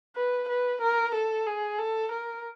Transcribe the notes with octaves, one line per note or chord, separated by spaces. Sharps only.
B4
B4
A#4
A4
G#4
A4
A#4